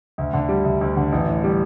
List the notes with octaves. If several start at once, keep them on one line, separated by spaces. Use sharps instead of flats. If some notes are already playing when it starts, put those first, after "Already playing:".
D2
D3
G3
D2
D2
D3
A1
A2
G3